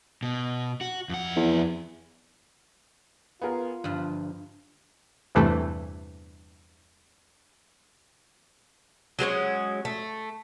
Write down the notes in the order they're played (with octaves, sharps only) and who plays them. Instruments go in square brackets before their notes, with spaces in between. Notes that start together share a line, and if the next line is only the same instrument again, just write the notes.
[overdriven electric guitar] B2
F#4
F2 F#5
[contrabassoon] E2
[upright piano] B3 G#4 A#4 [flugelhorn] F4
[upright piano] G1 [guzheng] G2 F3
[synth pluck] E2 G2 C3 E3 A3
[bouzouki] F#3 G#3 C4 C#4
A3